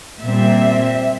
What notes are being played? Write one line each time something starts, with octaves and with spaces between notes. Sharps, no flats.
A#2 G3 C4 E5